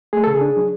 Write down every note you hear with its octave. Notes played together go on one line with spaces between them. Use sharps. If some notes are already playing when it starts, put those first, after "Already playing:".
A3 G#4
C#3 A4
G#4
D4
F#3